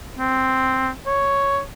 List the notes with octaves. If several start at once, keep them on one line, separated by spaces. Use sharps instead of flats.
C4
C#5